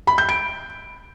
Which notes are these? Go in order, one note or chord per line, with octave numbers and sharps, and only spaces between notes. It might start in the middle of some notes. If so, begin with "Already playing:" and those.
B5
G6
D7